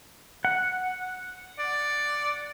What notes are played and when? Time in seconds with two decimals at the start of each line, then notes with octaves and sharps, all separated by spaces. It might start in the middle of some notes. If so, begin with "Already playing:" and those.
0.45 F#5
1.59 D5